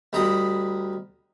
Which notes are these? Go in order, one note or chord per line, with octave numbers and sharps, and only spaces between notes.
D2 G3 D#5 A#5 B5 D#6